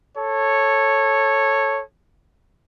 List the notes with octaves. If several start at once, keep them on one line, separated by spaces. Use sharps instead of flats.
A4 C#5